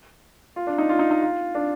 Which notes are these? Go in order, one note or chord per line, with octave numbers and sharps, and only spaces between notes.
F4
D4
D#4
F4
D#4
D#4
F4
D4